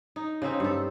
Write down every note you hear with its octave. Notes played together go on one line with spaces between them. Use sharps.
D#4
C#3 A#3 C4 D#4
G2 A4